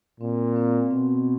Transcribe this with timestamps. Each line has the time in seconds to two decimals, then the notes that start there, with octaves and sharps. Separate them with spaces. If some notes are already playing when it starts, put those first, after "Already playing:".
0.20 A#2 C4
0.56 C4
0.91 B2 C4